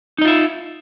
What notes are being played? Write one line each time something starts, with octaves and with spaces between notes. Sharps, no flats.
D#4 F4 D#5 E5